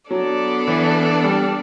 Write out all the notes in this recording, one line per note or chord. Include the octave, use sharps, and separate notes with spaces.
F#3 B3 D4 A4 D5
E3
G3